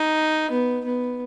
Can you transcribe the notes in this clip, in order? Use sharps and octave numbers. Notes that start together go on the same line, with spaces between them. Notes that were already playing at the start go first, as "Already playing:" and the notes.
Already playing: D#4
B3
B3